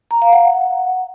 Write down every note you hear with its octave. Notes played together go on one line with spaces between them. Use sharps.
A#5
F5
F#5